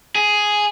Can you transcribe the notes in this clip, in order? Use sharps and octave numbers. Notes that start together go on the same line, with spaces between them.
G#4